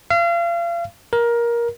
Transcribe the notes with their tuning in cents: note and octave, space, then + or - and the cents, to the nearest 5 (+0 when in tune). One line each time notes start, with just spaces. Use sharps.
F5 -35
A#4 +15